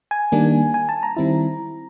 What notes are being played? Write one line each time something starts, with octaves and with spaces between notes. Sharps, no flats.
G#5
D#3 G3 A#3 D4
G#5
A5
A#5
D#3 G3 C4 E4